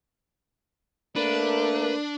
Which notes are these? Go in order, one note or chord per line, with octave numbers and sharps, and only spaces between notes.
A3 A#3 D4 A#4 B4